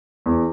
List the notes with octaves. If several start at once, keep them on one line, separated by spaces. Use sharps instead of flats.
E2